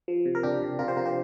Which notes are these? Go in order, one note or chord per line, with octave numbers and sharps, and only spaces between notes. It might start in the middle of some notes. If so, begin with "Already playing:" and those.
F3
C3
A#4
C3 D4 G4
C3
C3 F4 A#4
G4 C5
C3 F4 A#4
G4 C5